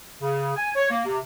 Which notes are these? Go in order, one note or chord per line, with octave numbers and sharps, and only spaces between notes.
C#3
G#5
C#5
A#3
C3